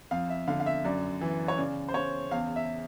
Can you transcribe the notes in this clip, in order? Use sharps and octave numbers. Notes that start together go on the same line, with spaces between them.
F2 F5
E5
D3 F5
F5
E5
F#2 D5
E3
C#5
C#3 D5
C5
C#3 C#5
E2 F5
E5